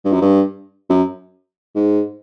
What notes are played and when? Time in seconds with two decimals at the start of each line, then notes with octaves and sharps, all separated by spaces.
0.05 G2
0.13 F#2
0.22 G2
0.90 F#2
1.75 G#2